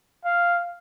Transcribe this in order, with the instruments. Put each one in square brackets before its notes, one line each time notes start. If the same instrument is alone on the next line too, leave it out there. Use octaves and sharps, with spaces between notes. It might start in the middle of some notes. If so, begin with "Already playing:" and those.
[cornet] F5